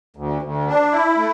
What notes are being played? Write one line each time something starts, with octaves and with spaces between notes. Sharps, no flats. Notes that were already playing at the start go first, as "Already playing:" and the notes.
D2
D2
D4
E4
A3